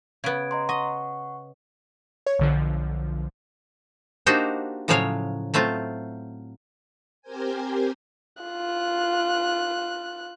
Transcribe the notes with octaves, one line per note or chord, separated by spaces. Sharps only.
C#3 B3 G#6 D7
D#5 A#5 C6
D#5 F#5 C#6
C#5
B1 D3 F3
A#3 D4 D#4 F#4 G4 C5
A2 C#3 F3 F#3 C#5 F5
F#3 A3 C4 F4
C4 G4 A#4 C5 G#5
F4 F#6